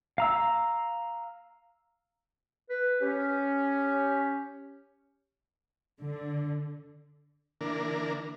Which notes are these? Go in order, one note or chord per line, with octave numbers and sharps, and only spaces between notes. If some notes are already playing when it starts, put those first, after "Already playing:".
F5 A#5 E6
B4
C#4 G4
D3
D3 E3 A#3 D4 A#4